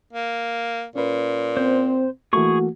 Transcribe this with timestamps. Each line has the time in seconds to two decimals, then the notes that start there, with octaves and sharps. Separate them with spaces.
0.13 A#3
0.96 A#2 C#4 B4
1.57 C4 C5
2.33 E3 A3 A#3 F#4 G#4 C#6